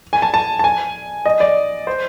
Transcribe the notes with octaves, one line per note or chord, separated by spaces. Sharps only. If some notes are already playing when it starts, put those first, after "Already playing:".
G#5
A5
A5
A5
G#5
D#5
D5
C5